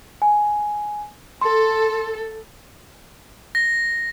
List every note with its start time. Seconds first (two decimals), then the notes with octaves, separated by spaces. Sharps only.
0.22 G#5
1.41 A4 C6
3.55 A#6